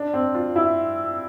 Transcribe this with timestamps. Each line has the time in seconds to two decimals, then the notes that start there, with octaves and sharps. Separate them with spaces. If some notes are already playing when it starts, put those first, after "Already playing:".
Already playing: D4
0.14 C4
0.34 F4
0.56 E4